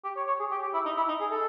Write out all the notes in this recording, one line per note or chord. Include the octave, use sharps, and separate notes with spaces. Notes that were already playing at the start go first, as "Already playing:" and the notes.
G4
C#5
C#5
G#4
G4
G4
E4
D#4
E4
D#4
G#4
A4